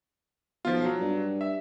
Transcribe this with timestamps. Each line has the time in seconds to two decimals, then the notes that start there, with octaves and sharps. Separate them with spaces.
0.65 B1 F3 F4
0.85 F#3
1.00 G2
1.41 E5